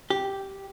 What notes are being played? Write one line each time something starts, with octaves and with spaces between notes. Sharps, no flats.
G4